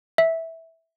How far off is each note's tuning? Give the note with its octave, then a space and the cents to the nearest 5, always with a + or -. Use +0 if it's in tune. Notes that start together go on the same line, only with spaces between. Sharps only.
E5 -10